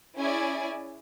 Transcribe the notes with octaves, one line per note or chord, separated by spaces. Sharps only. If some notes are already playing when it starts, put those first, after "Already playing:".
C#4 E4 G#4 D5 G#5